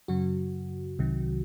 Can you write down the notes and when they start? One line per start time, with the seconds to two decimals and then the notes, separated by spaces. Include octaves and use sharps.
0.08 F#2 C#3 F#3 F#4
0.99 C2 C3 D#3 F#3